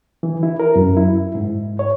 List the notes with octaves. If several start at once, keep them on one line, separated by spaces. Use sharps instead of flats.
E3
E4
A#4
F#2
E4
G#2
C#5